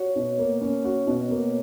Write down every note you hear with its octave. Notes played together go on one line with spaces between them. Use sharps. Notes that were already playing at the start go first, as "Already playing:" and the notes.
Already playing: F#4 C#5
B2
A#3
C#4
F#4
B2
A#3